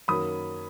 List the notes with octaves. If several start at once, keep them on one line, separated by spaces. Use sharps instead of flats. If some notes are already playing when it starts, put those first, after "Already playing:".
F#2 D#3 F#3 A#3 B5 D#6